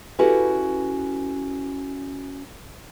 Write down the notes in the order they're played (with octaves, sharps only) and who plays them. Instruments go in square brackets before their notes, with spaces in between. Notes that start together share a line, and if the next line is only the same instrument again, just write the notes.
[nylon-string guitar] C#4 E4 F#4 G4 A4 B4